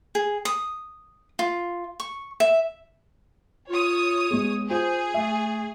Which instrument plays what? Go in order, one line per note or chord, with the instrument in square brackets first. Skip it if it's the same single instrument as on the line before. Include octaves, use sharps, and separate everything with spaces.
[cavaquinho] G#4
D#6
F4
C#6
E5
[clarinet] F4 [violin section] C#5 D#6
[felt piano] G#3 B3 [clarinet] G#4
[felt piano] F4 [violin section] G#4 [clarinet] C5
[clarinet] A3 [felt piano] E5